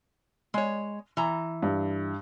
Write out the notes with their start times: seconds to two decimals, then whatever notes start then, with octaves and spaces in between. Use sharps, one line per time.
0.54 G#3 C#5
1.17 E3 A#5
1.62 G2